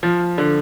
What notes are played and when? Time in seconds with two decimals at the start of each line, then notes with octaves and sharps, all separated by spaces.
0.03 F3
0.38 D3